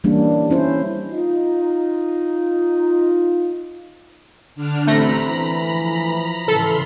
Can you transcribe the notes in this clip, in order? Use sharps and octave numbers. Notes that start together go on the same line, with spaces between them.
E3 G3 A#3 C#4 D4
C4 C#4 E4 C5
D#4 F4
D3 D4 F6
A1 A3 C4 A#5 B5 A#6
E3
F3
G#2 C#3 E3 A4 B5 C6 F6